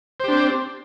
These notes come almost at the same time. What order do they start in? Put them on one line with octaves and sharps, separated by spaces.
C5 G4 D4 C4